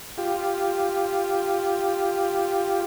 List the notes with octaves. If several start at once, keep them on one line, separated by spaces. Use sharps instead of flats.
F4 G4